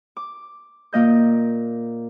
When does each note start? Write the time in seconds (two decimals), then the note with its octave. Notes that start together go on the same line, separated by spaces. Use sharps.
0.17 D6
0.93 A#2 A#3 D#5 G6